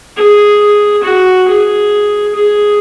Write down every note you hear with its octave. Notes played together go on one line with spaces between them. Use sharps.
G#4
F#4
G#4
G#4